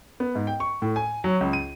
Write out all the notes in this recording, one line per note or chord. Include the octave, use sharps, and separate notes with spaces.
B3
G#2
G5
C#6
A2
G#5
F#3
C#2
D#7